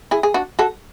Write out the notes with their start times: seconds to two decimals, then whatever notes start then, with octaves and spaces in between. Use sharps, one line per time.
0.11 E4 G#4
0.23 G#4
0.34 D4 F#4
0.59 F#4 A4